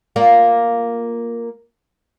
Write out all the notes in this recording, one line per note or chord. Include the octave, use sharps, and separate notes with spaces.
A#3 F4 D5